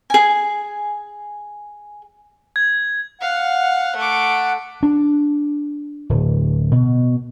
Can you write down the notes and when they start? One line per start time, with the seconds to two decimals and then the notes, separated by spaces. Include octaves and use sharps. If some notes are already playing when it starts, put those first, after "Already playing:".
0.10 G#4 G#5
2.56 G#6
3.21 F5 F#5
3.96 A3 D6
4.83 D4
6.10 D1
6.72 B2